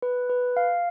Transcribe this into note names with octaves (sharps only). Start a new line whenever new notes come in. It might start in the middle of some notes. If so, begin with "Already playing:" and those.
B4
B4
F5